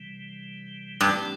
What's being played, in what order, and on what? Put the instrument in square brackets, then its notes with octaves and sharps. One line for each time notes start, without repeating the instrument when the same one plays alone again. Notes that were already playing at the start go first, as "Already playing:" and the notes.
Already playing: [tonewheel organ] C3 E3 G3
[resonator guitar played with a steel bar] G2 [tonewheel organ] E3 A3 C4 G4 D5